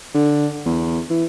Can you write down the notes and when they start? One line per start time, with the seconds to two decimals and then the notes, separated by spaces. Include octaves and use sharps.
0.15 D3
0.66 E2
1.10 E3